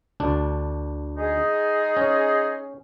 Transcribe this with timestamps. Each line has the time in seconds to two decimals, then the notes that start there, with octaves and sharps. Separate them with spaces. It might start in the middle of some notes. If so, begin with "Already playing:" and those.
0.20 D2 D4
1.17 G#3 D#4 G#4
1.97 C#4